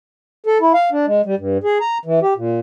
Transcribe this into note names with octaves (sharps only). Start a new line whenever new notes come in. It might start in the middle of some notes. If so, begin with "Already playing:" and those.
A4
E4
F5
D4
G#3
G3
G2
G#4
A#5
E3
G4
A#2